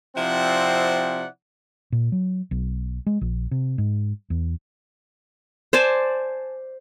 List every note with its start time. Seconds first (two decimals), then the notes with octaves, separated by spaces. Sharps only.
0.17 C3 F3 C4 E4 D5 F#5
1.92 A#2
2.12 F#3
2.51 B1
3.06 G#3
3.21 A#1
3.51 C3
3.78 G#2
4.30 E2
5.73 C5 D5 G#5 A5